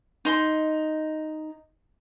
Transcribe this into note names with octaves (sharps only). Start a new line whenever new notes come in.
D#4 C6